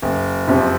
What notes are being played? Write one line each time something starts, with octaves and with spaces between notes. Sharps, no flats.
F#1
F2 C3